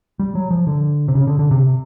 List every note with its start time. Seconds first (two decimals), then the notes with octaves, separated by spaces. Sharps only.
0.19 G3
0.35 F#3
0.51 F3
0.67 D3
1.08 C3
1.15 C#3
1.27 D3
1.39 D3
1.51 C3